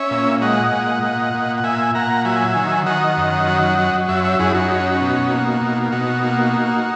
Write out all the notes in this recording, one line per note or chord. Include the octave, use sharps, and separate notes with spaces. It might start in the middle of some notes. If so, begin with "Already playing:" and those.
Already playing: C#4 C#5 E5
A#2
G#3 D#5 F#5
A#2
A#2
A#2
F#5
A#2 E5 G#5
A#2 F#5 A#5
F#3 E5 G#5
D#3
D#3 D#5 F#5
F#2
F#3
F#3
F#2 C#5 E5
C#5 E5
F#2 E4 G#4
D#4 F#4
C#4
B2
A#3
B2
B2 D#4 F#4
A#3
A#3